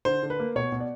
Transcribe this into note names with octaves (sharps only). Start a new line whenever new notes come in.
D3 C5
D3
B4
A#3
B2 C#5
B2
D5